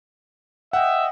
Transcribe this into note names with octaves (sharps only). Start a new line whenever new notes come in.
D#5 E5 F#5 G5